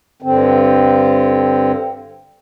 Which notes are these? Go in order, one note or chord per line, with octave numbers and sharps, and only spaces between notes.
G2 D3 C4